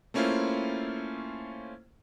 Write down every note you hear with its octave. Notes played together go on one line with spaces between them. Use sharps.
A3 A#3 C#4 E4 F4 C5